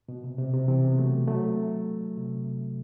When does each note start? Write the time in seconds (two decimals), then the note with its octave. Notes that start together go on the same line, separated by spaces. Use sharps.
0.09 B2
0.24 C3
0.38 C3
0.53 C3
0.68 C3 E3
0.89 B3
0.98 F#3 A3
1.28 F#3 A3
2.17 C3